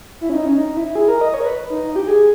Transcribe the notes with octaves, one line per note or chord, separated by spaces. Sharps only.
E4
C#4
D#4
C#4
D#4
E4
G#4
A#4
D#5
C#5
A#4
B4
D#4
D#4
G4
G#4